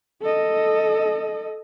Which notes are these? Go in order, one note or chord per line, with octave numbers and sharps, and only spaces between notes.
A4 D#5